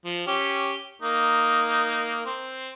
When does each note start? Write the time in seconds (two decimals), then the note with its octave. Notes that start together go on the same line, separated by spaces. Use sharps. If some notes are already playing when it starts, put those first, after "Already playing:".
0.05 F3
0.27 C#4 G4
1.02 A#3 D#4
2.26 C4